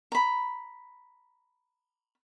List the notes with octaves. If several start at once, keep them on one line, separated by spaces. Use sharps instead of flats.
A#5 B5